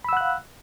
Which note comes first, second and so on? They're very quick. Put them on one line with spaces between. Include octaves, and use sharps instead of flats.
B5 E6 F#5 F#6 F5